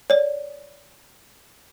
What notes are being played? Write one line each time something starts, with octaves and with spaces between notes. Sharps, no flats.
C#5 D5